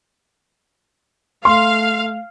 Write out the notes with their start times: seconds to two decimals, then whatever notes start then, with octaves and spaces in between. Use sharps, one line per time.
1.45 A3 F5 C6